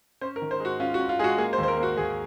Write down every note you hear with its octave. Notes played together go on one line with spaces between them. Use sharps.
C#4 C5
A#4
D#3
C5
G#3 F#4
C#4 F4
F#4
C#4
F4
G#3 F#4 G#4
A#3 G#4
C5
D#2
C5
A#4
A#3
F#4
D#2 G#4